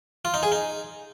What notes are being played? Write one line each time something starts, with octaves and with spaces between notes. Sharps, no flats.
F4
D#4
G#4
D#4